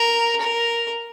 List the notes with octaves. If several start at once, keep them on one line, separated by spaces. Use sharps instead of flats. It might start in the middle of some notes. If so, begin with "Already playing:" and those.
Already playing: A#4
A#4